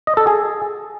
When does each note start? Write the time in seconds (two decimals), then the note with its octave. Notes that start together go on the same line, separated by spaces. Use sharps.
0.07 D#5
0.17 A4
0.27 G#4